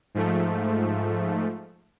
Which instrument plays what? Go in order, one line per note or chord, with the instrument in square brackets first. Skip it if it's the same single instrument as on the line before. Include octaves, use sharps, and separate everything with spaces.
[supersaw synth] G#2 F3 A3